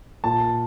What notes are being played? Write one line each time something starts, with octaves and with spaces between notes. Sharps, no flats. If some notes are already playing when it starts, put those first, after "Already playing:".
A#2 A5